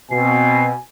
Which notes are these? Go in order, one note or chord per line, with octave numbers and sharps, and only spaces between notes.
B2 C4 G#5 C7